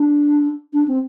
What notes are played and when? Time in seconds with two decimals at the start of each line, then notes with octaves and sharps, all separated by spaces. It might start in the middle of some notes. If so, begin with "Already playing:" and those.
Already playing: D4
0.73 D4
0.88 C4